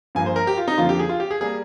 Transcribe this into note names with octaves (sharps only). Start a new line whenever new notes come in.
G2 F3 A#3 G#5
C5
A#4
G4
F4
D#4
F2 D3 F3 A#3 F4
G4
G#4
F4
G4
G#4
G3 A#3 G#4